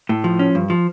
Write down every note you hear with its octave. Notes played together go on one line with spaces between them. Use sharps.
A2
F3
C#4
G2
F3